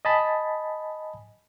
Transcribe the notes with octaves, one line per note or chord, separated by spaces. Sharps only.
D#5 G#5 A5 B5